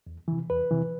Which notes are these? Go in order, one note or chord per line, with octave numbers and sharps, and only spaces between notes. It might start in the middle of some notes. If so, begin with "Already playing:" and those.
E2
C3 E3
E2 B4
C3 E3